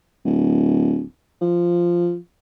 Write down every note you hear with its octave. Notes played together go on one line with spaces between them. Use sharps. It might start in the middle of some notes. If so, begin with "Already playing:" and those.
D1
F3